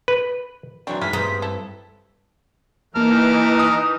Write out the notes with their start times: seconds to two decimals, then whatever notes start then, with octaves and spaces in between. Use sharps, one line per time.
0.08 B4
0.87 E3 F#3 C4 D4 C#6
1.01 G#2 E3 E4 F6 B6
1.13 G2 G#3 B3 C4 D#4 D#6
1.42 E4 A4
2.96 E3 A#3 D#4 A#4 A5 F6
3.59 D#6